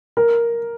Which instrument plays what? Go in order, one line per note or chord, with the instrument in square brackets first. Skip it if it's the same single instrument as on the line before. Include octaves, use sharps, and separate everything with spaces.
[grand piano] A#4